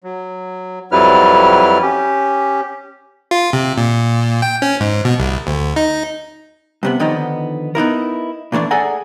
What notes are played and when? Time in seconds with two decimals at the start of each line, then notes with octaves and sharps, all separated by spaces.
0.04 F#3
0.92 F2 F#3 G3 E4 B4 F6
1.82 C#4 G4
3.31 F4
3.53 C3
3.78 A#2
4.42 G5
4.62 C#4
4.80 G#2
5.05 B2
5.19 C2
5.47 D2
5.76 D#4
6.83 G2 C3 B3
7.00 D3 D#3 F3 B3 D#4
7.75 B3 D#4 E4 A#4
8.52 A#2 E3 A3 D4
8.71 G#4 A4 D5 F#5 G#5 A#5